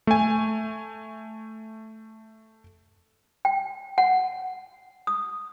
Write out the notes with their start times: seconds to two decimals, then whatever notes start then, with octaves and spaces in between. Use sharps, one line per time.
0.07 A3 G#5
3.45 G5
3.98 F#5
5.07 D#6